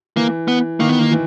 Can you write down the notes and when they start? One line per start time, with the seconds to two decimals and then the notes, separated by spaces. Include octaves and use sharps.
0.16 E3 A#3
0.48 B3
0.80 D#3 A#3
0.89 B3
0.99 D#3 A#3
1.12 E3